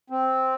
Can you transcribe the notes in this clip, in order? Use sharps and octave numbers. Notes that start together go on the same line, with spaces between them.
C4